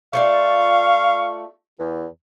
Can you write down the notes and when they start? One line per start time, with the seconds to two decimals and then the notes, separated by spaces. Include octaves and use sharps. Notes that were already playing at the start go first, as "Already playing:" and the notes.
0.13 A3 F4 D5 F5 C#6
1.79 E2